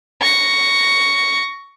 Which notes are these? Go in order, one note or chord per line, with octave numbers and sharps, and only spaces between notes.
C#6 A#6